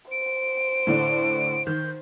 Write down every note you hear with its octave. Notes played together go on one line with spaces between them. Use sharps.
C5 D7
A2 D3 D4
D#3 G6